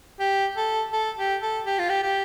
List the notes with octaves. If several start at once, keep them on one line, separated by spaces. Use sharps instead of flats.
G4
A4
A4
G4
A4
G4
F4
G4
G4